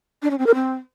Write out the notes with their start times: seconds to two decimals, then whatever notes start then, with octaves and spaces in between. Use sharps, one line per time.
0.22 D4
0.30 C#4
0.38 C4
0.47 A#4
0.55 C4